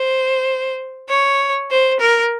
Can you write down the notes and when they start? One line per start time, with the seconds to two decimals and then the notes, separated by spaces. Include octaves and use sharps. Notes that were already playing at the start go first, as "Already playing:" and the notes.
Already playing: C5
1.09 C#5
1.71 C5
2.00 A#4